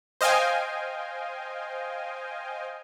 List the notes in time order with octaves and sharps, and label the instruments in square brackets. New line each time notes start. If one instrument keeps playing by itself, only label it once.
[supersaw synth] C5 D#5 F5 G5 G#5